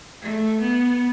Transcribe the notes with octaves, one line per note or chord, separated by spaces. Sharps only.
A3
B3